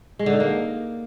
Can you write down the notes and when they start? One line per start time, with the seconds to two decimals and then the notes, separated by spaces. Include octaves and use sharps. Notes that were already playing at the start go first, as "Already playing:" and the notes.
0.19 G#3
0.26 D3
0.33 D#4
0.40 A#3